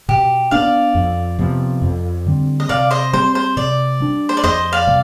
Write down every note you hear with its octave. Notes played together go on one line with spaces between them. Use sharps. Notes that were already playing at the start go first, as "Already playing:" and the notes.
B2 G4
B3 D4 D5 F5
F2
C3 F3 B3
F2
D3 G3 C4
D#5
C3 D5 F5
C5 D#5
G3 C4 C5
C5
C3 D5
G3 D4
C5
D5
F2 C5 D#5
D5 F5
C3 G3